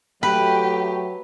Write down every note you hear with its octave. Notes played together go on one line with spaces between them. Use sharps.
F#3 A3 G4 B4